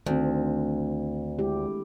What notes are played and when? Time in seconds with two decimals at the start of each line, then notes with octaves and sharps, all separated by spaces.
0.06 D2 D#3 C4
1.39 G#3 E4 G4